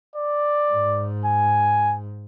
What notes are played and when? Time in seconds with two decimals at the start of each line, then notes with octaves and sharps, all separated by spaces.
0.16 D5
0.72 G#2
1.26 G#5